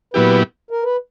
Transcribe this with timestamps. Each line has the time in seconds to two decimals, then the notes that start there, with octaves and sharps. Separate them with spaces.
0.14 A#2 F#3 B3 E4 G4 B4
0.71 A#4
0.84 B4